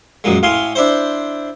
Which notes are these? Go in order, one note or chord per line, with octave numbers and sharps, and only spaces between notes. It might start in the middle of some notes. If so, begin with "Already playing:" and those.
F#2 A#2 G#3
A2 F5 G#5 C6
D4 E4 C5